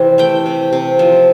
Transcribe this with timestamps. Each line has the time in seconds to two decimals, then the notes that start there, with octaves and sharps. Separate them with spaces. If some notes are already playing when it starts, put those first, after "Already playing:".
Already playing: C3 E3 C4
0.18 A3 G5
0.46 C3
0.73 C3
0.99 F3